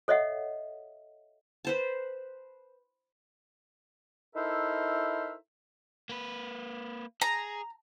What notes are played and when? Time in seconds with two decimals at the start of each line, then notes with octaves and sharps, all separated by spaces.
0.08 A4 C#5 D#5 E5 F#5
1.65 B4 C5 A5
4.36 D#4 E4 A4 A#4 C5 E5
6.09 A#3 B4
7.21 G#4 A#5